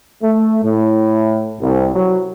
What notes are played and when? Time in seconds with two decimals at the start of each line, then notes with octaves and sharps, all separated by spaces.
0.21 A3
0.63 A2
1.61 C2
1.94 F#3